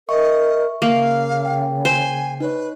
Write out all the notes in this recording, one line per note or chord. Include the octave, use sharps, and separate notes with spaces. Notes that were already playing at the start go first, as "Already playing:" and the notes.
A#4 D#5 E5 C#6
C#3 A#3 F5
G5
C5 G#5
D#4 B4 C#5